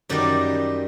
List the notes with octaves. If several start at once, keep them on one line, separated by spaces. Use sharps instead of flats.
F#2 D#3 G3 D5